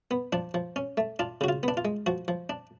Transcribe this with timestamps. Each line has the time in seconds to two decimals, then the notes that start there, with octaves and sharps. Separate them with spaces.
0.11 B3
0.33 F3 D4
0.54 F3
0.76 C#4
0.97 A3
1.19 D4 F4
1.41 C#3 F#4
1.49 F4
1.63 B3 D4
1.77 F4
1.85 G#3
2.06 F3 F#4
2.28 F3
2.49 D4